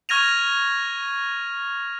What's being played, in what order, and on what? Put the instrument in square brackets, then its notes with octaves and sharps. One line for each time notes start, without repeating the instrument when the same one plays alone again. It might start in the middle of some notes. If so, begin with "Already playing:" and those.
[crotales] C#6 F6 G#6 A#6 D#7 F7